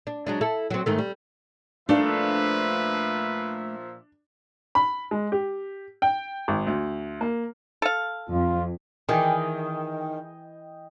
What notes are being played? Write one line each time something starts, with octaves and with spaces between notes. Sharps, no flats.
D4
F#3 G#3 D4
E4 A4
F#3 C4
G#2 D#3 A3
G3
A#2 F3 A3 D4 B4 E5 F5
B5
G#3
G4
G5
G#1
D2
A#3
A4 F5
F2 F4
D#3 E3 G#4 D5 D#5 G5 G#5